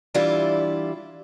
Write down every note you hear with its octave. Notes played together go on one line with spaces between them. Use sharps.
E3 G3 D4 E4 F4